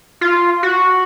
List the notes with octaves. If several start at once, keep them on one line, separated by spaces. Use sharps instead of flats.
F4
F#4